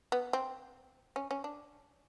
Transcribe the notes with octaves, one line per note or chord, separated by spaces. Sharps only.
B3
C4
C#4
C#4
D4